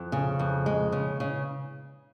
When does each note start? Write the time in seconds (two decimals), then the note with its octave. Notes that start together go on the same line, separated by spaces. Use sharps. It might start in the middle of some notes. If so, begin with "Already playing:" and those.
Already playing: F2
0.12 C#3
0.39 F2
0.66 G#3
0.92 C#3
1.20 C#3